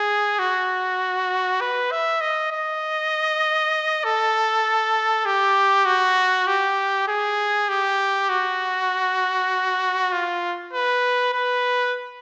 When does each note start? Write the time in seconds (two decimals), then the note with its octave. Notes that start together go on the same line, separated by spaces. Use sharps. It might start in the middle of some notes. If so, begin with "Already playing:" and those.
Already playing: G#4
0.39 F#4
1.61 B4
1.91 E5
2.21 D#5
2.52 D#5
4.04 A4
5.26 G4
5.86 F#4
6.47 G4
7.08 G#4
7.69 G4
8.29 F#4
10.12 F4
10.73 B4
11.33 B4